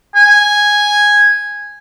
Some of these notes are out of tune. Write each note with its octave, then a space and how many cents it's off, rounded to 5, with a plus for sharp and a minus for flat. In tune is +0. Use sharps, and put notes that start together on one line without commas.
G#5 -5